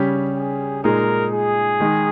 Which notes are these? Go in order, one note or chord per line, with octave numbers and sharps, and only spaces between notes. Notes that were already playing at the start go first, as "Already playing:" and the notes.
Already playing: C#3 G3 C#4 G4
G#4
A#2 G#3 D#4 G#4 A#4
G#4
D#3 G#3 D#4